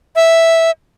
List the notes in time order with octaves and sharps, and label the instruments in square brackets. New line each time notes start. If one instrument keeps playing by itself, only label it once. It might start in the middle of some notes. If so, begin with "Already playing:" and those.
[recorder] E5